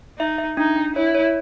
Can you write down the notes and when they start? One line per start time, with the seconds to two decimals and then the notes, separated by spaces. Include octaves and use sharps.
0.19 D#4 E5
0.38 E5
0.57 D4 D#4
0.76 D4
0.95 E4 C#5
1.15 C#5